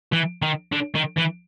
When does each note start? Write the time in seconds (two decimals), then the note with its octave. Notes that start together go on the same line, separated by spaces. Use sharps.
0.13 E3
0.42 D#3
0.72 D3
0.94 D#3
1.17 E3